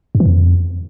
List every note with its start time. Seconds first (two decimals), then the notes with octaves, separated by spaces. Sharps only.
0.15 G2
0.20 E3
0.26 F2